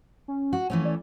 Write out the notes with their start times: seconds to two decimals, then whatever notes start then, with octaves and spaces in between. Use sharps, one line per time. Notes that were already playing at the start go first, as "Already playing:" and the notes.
0.28 C#4
0.53 F#4
0.70 E3 F3 A3 C#4
0.85 D5